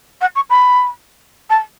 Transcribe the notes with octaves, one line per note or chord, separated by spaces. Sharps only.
F#5
C#6
B5
A5